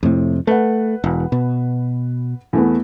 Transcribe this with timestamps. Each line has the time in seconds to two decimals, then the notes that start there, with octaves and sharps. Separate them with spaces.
0.03 F2 A2 C3
0.47 A3 B4 F#5
1.04 E1
1.32 B2
2.53 E2 A3 B3